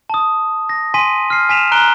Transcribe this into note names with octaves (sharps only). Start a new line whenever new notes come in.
A5 D#6
A#6
G#5 C6 B6 D#7
F6 C7
G#5 B6 E7 F7
A#5 F#6 D7 G7